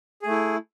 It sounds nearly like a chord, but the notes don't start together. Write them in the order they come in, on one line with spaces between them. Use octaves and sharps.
G#4 A3 E4